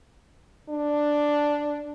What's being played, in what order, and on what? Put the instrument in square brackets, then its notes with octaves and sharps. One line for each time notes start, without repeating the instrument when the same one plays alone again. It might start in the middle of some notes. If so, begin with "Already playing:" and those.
[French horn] D4